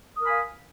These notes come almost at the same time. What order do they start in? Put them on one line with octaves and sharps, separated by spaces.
D#6 A#4 G#5 B5 F5